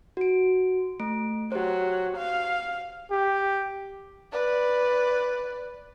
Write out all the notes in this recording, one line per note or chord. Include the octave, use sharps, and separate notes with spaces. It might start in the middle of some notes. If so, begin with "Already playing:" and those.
F#4 D7
A3 D7
F#3 G4 C5
F5
G4
B4 D5